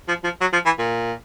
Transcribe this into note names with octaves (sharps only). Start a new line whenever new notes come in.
F3
F3
F#3
F3
E3
A#2